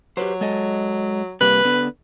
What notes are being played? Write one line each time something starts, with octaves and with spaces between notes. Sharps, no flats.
F#3 G4 B4 C5
G#3 A4 D#5
C3 G3 A#3 B4
D3 B3